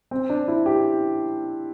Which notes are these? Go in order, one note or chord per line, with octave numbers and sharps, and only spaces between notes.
C4
D4
E4
G4